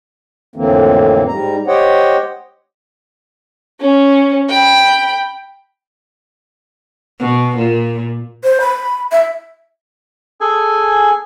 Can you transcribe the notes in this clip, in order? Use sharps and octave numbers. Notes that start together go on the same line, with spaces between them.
F2 A2 D3 E3 A#3 C4
G#2 G3 A#5
G4 C5 C#5 D#5 F#5 G5
C#4
G5 B5
B2
A#2
C5
B5
E5
G#4 A4 G#5